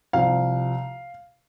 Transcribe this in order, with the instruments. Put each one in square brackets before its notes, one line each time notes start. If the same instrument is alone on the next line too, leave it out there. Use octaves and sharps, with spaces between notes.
[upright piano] C2 C3 F3 F5